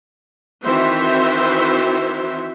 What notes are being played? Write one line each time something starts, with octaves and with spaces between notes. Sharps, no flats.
D#3 E3 C4 F#4 C5 E5